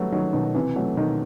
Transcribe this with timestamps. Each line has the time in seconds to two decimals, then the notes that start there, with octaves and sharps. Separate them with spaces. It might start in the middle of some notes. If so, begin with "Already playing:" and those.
Already playing: F#3 G3 A3 B3
0.12 D#3 F#3
0.33 B2 D#3
0.55 C3 E3
0.76 F#3 A3
0.97 B2 D#3